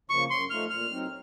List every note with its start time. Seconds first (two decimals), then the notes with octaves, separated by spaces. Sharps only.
0.10 C#3 F3 A#3 C#6
0.30 F#2 C6
0.50 F3 A3 D#4 F6
0.70 A#2 F6
0.90 F#3 C4 D#4